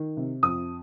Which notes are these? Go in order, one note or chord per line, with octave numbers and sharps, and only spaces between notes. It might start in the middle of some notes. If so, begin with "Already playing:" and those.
Already playing: D#3
C3
F2 D#6